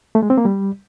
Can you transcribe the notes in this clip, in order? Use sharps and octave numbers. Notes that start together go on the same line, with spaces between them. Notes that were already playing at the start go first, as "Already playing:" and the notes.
A3
G#3
C4
A#3
G3